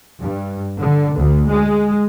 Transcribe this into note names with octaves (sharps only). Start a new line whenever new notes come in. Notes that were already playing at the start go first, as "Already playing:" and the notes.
G2
D3
D2
G#3